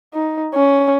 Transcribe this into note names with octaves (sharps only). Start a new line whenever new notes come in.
D#4
C#4